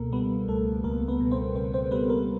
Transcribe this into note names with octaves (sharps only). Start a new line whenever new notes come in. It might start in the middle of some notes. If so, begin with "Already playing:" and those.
Already playing: C#2 B2 A#3 A4 A#4
G3 B3 B4
C#2 A3 A4
C#2 A#3 A#4
B3 B4
B2
C4 C5
C#2 C4 C5
C4 C5
G3 B3 B4
A#3 A#4